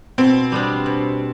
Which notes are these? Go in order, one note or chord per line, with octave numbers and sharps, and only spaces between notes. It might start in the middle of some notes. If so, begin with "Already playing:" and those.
B2 C4
G3 B3 D4
B2